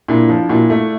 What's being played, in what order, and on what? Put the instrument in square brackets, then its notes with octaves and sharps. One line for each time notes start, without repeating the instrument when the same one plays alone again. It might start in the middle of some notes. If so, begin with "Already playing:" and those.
[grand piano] A#2 [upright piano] D4 E4
[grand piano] F3
[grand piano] A#2 [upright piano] E4 F#4
[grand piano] A3